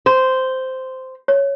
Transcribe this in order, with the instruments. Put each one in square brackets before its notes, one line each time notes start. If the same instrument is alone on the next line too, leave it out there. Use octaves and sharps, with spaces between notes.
[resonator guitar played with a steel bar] C5
[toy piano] C#5